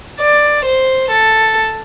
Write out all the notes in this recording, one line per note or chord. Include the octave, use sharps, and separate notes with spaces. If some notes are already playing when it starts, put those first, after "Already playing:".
D5
C5
A4